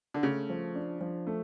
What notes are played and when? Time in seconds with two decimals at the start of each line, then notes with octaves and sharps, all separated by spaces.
0.14 D3
0.23 C#3 A3
0.50 F3
0.75 D4
1.01 F3
1.27 A3